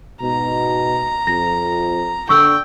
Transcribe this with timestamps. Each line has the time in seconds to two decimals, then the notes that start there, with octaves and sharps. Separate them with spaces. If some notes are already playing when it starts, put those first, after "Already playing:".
0.22 G#2 B2 A#5
1.27 F2 A#6
2.29 D3 G5 C#6 E6